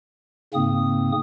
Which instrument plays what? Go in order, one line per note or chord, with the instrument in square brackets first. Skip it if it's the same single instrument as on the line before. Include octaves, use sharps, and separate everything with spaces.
[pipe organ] G#2 C#3 A#3 C4 D#6